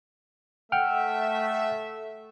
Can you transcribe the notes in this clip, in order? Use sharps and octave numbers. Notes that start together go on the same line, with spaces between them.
A3 E5 F#5 G5 F6